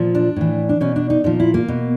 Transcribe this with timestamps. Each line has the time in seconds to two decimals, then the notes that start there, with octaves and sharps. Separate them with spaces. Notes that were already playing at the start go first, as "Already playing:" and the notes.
Already playing: A#2 F3
0.15 D4
0.36 A2 E3
0.69 D4
0.81 B2 C#4
0.96 D4
1.10 D#4
1.24 A#2 F3 D#4
1.40 E4
1.54 A#3
1.68 B2